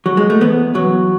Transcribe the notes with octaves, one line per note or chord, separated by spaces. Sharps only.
F#3
G#3
A3
E2 B3
E2 F#3